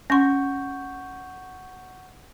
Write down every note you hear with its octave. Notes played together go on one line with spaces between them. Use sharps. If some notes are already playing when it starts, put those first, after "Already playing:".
C#4 F#5 C6 C#6 G6